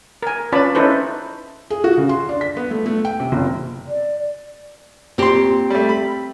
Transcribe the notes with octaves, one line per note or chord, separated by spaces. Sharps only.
A#4 G#5
C#4 F4 B4 D5 A5 B5
C#4 D#4 E4 A4 B4 C5
G#4
F#4
C#3
C6
D4
B6
B3
A3
A3
G5
C3
F#1
D5
A#2 C4 G4 C6
G3 A3
B5